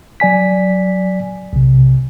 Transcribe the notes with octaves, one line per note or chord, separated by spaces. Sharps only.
F#3 D5 G#5 B6
B1 C3